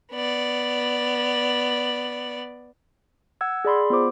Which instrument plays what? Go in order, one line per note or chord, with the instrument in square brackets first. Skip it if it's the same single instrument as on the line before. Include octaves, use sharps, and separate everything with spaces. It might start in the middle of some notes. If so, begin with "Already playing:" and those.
[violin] B3 D5
[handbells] F#5 E6 G#6
G#4 D5 B5 C6
B3 F4 C5 D6